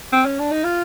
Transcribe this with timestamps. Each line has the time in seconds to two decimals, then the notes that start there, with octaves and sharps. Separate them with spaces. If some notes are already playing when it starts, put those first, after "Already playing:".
0.13 C4
0.25 C#4
0.39 D4
0.51 D#4
0.64 F4